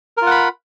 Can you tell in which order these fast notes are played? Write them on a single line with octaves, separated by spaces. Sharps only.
A#4 F4 F#5 B5